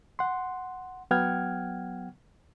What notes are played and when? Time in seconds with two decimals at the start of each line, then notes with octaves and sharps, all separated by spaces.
0.19 F#5 C6
1.11 F#3 B3 F#5 G5 F6 G#6